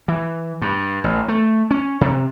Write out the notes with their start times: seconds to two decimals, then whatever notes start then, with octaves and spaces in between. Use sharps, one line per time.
0.08 E3
0.62 G2
1.04 A1
1.28 A3
1.71 C#4
2.01 C3